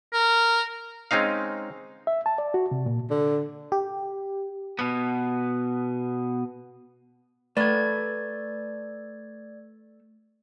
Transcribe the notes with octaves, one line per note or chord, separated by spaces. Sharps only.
A#4
G#3 C4 C#4 D#4 F5
E5
A5
D5
F#4
C3
A#2
D3
G4
B2 B3
A3 B4 D5 G#6